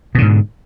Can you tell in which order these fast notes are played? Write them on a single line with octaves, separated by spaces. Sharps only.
B2 D3 G#2